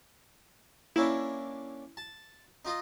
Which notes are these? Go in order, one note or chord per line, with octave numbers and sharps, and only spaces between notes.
A#3 C#4 D4 E4
A5
D#4 F4 D#5